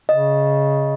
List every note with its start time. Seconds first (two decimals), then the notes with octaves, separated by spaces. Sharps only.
0.09 C#3 D#5